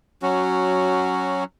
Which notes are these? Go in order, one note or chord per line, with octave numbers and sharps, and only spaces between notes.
F#3 C#4 F#4